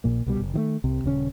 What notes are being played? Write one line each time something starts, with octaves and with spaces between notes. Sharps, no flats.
A#1 A#2 A#3
C2 B2 G3
F#1
D#3 E3 A3
C2 C3
D#1 C#3 C#4